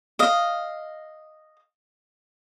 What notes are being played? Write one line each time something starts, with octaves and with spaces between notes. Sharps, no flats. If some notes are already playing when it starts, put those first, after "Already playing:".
D#5 F5